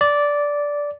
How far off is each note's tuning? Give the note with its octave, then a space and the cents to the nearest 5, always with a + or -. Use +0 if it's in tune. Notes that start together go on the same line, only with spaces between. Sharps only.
D5 -10